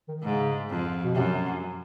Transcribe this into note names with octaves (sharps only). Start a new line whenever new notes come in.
D#3
G#2 C#3
F2
B2
F#2 C3